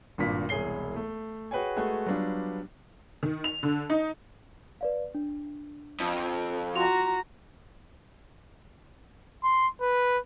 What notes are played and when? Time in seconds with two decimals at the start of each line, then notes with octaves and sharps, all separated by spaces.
0.18 G#1 G2 A#2 B6
0.49 E1 C2 G#4 C#5 C7 G7
0.96 A3
1.51 F#4 G#4 B4 C#5 G5 G#5
1.76 G#3 A3 F#4 G#4 B4 G#5
2.06 F#3 G3 B3 D4 F4
3.23 D#3
3.44 F7
3.63 D3
3.90 D#4
4.81 B4 D5 F5
5.14 D4
6.00 F2
6.76 F4 F#4 A#5 C6 F7
9.43 C6
9.81 B4